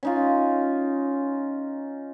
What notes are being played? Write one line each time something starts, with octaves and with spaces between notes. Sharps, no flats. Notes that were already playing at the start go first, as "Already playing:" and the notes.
C#4 D#4 F4